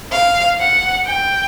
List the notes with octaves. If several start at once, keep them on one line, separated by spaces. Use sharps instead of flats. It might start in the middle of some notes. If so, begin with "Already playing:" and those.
F5
F#5
G5